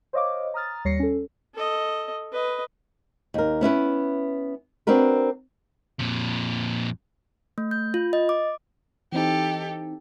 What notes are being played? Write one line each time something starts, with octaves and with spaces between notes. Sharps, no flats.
C5 C#5 D#5 F5 D6
A#5 D#6 F6 A6
D#2 G3 C#5 A#6 C7 C#7
C#4 A4
A4 D#5
B4 D#5
D#2 A#4
B3 C#4 E4 B4
C4 D4 F#4 A#4 B4
F2 A#2
A3
G6
F4
D#5
D6
E3 C4 D#4 G4 A4